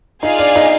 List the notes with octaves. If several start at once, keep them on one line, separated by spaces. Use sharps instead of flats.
D#4 F4 G#4 D5 F5 G#5
D4
D#4